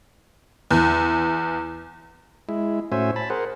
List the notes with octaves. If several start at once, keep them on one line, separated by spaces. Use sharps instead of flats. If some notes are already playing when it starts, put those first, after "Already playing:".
E2
G#3 E4
A2 C#4 F#4 C5 E5 G#5
A5 B5
G#4 A#4 C5 F#5